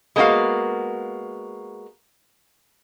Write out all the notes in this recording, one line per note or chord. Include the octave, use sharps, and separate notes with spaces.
G#3 A#3 B3 D4 F#4 F5